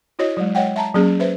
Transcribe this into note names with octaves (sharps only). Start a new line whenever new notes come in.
E4 F#4 C#5 D#5
F#3 G#3
G#3 C#5 D#5 F#5 G5
E5 A5 A#5
F#3 A#3 C#4 G#4
B4 C5 E5